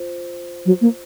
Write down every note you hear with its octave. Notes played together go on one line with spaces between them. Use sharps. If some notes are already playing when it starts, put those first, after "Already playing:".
Already playing: F4 C5
F#3
A#3